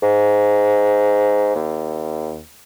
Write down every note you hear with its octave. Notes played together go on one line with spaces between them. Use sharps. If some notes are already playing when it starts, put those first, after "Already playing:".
G#2
D#2